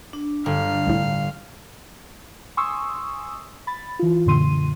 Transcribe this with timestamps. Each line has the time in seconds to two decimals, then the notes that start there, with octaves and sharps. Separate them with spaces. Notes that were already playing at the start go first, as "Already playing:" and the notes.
0.13 D4
0.46 G1 F5
0.87 C2 A2
2.57 G#5 C6 C#6 D#6 E6
3.67 B5 A6
3.99 E3 F4
4.26 F#2 A#2 D3 C6 D#7